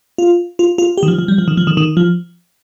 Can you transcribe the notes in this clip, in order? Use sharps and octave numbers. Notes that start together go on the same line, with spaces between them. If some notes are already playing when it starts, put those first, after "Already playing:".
F4
F4
F4
G4
D#3
F3
F3
G3
F3
D#3
F3
D#3
D#3
F3